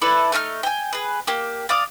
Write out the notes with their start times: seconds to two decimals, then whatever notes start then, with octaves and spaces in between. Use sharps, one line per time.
0.02 E4 A4 B4 D5
0.32 A3 D#4 F5 F6
0.63 G5 G#5
0.93 G#4 B4
1.27 A#3 G4
1.69 D5 F5 D6 D#6